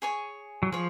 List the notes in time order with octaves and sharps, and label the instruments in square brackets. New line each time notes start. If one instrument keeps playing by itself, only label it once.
[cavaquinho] G#4 C#5 G#5 C#6
[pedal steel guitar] F#3
[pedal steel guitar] F3 [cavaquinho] G#4 C#5